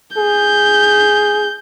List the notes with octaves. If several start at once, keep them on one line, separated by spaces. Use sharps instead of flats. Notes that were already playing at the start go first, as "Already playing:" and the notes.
G#4 G6